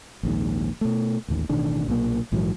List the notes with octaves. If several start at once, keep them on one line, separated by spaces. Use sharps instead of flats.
A#1 D#2 G#2
B2 A3
A1 D#2 D#3
A1 B2 D#3 D4
B1 A#2 C#3 A#3
A#1 G#2 E3 F#3